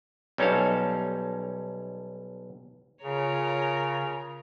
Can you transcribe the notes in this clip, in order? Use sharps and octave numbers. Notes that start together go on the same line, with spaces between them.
B1 G3 C#4 D#4 A4 F5
C#3 F4 A#4 C#5